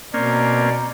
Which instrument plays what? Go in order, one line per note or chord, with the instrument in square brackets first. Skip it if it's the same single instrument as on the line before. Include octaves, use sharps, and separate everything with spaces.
[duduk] B2 [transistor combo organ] A#3 C4 C#4 [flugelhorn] D5 [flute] A#5